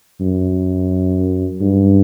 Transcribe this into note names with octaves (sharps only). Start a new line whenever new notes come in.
F#2
G2